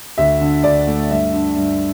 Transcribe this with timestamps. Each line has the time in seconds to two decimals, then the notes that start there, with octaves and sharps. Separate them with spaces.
0.18 D2 E5
0.41 D3
0.64 D2 D5
0.87 A3
1.11 G2 E5
1.33 D3
1.57 G2